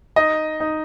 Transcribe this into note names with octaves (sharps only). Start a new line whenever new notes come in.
D#4 D#5
D#4